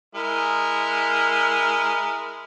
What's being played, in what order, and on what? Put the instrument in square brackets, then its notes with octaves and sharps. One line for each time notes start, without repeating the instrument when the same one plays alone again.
[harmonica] G#3 E4 A#4